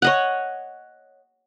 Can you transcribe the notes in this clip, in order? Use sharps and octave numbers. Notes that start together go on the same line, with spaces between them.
C#5 D#5 F#5